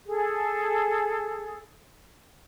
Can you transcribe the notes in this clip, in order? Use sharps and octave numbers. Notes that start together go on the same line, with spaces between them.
G#4 A4